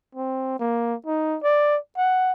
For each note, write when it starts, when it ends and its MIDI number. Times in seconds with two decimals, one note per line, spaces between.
0.15 0.56 60
0.59 0.95 58
1.06 1.38 63
1.43 1.78 74
1.97 2.32 78